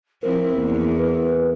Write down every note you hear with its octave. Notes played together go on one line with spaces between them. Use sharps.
F3 C4 E4 A#4 C5
E2 A#3
B4